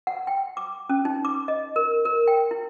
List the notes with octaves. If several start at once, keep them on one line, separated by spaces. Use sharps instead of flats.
F#5
G5
D6
C#4
D#4
D6
D#5
A#4
A#4
G5
E4